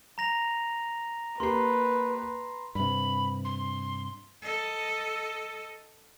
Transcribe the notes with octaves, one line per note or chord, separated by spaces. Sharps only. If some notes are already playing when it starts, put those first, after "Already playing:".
A#5 A#6 F7
A#3 G4 B4 C6 C7
G2 C3 B5
C6
A4 D#5